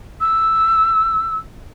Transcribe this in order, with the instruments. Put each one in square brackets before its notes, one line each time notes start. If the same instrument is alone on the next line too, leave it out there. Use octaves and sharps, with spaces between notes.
[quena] E6